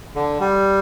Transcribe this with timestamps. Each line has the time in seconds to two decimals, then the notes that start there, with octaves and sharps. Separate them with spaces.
0.16 D3
0.40 G3